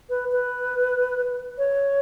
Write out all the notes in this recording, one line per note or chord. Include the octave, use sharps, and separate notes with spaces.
B4
B4
C#5